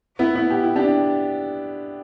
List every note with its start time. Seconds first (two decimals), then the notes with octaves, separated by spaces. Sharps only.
0.19 B3 E4
0.35 B3 E4
0.50 G4
0.64 E4
0.76 D4 G4